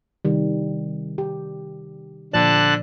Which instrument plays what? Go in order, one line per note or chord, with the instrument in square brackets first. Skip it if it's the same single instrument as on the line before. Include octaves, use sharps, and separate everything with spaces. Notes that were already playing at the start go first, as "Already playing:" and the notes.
[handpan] C3 D#3 G3
G4
[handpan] A#2 F3 D5 [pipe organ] D3 A5 F#6